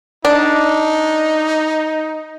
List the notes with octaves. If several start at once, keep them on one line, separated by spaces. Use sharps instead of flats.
D4 D#4